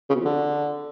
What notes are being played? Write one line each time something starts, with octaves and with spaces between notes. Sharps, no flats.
C#3
B2
F2
D3